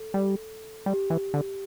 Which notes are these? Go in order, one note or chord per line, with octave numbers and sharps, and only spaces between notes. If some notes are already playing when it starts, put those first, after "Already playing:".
Already playing: A4
G3
G3 G4
E3
D3